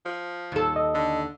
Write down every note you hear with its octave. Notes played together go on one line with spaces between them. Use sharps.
F3
D#2 A4
D#5
D3